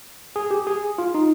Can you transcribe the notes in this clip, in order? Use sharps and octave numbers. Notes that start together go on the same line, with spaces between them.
G#4
G4
G#4
F4
D#4